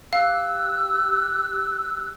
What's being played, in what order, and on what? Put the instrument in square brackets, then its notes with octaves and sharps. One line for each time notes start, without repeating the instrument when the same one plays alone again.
[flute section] G4 E6 F#6 [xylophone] F5